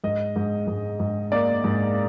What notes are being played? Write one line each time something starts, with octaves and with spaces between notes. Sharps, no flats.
G#2 D#5
G#2
G#2
G#2
A#3 D5
G#2